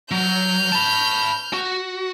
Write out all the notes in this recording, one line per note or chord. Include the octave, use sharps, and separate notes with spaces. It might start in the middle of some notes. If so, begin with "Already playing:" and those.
F#3 F6 G6
A5 B5
F#4